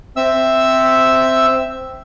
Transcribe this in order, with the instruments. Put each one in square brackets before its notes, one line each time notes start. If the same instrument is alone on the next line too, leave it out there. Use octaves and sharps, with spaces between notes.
[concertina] C4 E5 E6